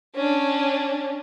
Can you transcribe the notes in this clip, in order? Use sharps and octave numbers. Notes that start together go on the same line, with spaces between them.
C#4 D4